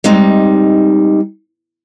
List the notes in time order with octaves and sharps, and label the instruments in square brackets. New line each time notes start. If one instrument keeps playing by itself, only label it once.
[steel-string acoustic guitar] G3 G#3 C4 D#4